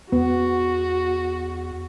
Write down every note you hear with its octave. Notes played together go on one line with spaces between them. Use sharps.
E2 B3 F#4